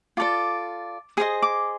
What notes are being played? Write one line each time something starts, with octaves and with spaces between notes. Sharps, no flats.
F4 A4 D5 D6
G#4 C5 D#5 D#6
D6